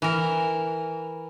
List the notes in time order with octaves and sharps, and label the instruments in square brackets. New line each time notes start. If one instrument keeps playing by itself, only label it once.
[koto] E3 A#4